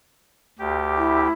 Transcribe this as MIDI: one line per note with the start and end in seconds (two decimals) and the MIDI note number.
0.59 1.28 38
0.59 1.28 67
0.97 1.31 64